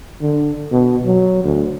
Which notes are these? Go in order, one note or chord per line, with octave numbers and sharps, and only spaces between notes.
D3
B2
F#3
D2